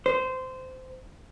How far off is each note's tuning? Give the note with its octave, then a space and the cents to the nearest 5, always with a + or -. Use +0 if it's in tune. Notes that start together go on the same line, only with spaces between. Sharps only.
C5 -20